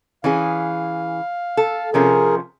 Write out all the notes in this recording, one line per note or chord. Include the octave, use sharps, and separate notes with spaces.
E3 C#4 G#4 F5
A4
C3 F3 C#4 G#4 A#4